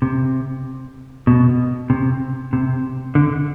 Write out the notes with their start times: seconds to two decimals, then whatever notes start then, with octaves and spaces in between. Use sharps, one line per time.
0.02 C3
1.27 B2
1.90 C3
2.53 C3
3.15 D3